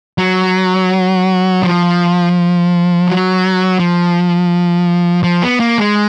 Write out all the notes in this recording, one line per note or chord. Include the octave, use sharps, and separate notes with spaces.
F#3
F3
F#3
F3
F3
B3
A#3
G#3